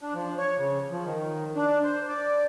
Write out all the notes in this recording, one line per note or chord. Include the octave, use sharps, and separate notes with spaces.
D4
F3
C#5
C#3
F3
D#3
D4
C5
D5